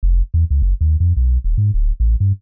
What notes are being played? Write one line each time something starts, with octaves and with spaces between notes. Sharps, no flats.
F1
E2
C#2
F#1
D#2
F2
B1
D#1
G#2
D1
A1
G2